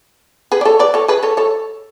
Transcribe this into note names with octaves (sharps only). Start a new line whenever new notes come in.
G#4 B4
D5
A4 C#5
B4 D5
A4 C#5
G#4 B4
A4 C#5
A4 C#5